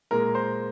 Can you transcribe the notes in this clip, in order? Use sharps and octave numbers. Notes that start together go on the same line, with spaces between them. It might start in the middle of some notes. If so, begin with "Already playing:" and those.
A#2 G#3 A#4
C5